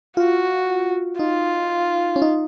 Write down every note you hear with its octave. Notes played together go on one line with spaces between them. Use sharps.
F4 F#4
D#4 F4
C#4
D#4